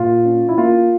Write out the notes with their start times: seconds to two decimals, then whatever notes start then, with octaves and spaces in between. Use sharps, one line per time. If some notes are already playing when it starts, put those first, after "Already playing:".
Already playing: A#2 F4
0.25 C#4
0.49 E4
0.58 A#3 F4